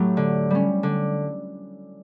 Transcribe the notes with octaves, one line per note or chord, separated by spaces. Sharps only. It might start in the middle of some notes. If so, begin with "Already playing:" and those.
Already playing: A2 F#3 A3 E4 G4
D3
G3 C#4
D3